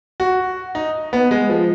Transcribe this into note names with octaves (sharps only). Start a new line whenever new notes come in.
F#4
D#4
B3
G#3
F3